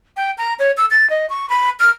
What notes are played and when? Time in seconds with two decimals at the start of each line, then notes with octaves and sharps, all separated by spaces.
0.17 G5
0.38 A#5
0.59 C#5
0.77 E6
0.91 A6
1.10 D#5
1.30 C#6
1.50 B5
1.80 F6